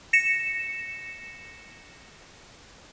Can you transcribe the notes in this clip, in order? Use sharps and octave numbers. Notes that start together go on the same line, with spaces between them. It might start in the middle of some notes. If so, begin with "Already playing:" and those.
A#6 C#7 E7